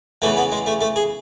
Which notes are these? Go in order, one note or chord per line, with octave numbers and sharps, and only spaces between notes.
E2 C#3 E3 A3
B3
G#3
A3
A3
G#4